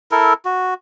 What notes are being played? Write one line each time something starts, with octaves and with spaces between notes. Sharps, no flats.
E4 A4 A#4
F#4